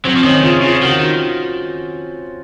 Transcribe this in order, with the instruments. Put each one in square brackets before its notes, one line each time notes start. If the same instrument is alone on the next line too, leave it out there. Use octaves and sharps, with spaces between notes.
[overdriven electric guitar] F#3 [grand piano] C4
[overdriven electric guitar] F3
[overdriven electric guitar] D#3 [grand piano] C#4
[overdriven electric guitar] C#3 [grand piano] F4
[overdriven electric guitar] C#3 [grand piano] F4
[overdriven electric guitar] D#3 [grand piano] F#4